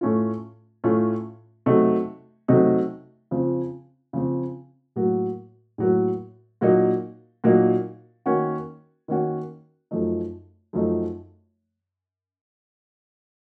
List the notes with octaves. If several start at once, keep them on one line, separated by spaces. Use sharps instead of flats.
A2 A3 C#4 F4
A2 A3 C#4 F4
C3 F#3 A3 D#4
C3 F#3 A3 D#4
C#3 F3 C4
C#3 F3 C4
A2 F#3 A#3
A2 F#3 A#3
A#2 F#3 A#3 D#4
A#2 F#3 A#3 D#4
D#3 A#3 C#4 F#4
D#3 A#3 C#4 F#4
F#2 F3 A3 D#4
F#2 F3 A3 D#4